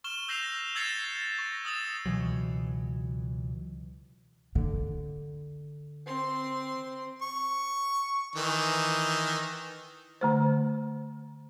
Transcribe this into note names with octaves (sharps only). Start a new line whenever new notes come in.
C#6 F6 E7 G7
E6 G6 A#6 C7 E7 F7
E6 G#6 A6 C7 C#7 E7
C#6 A#6
D#6 E6 A6 E7
C#2 B2 E3 F#3
D3
C4 C6
C#6
D#3 E3
D3 A3 C5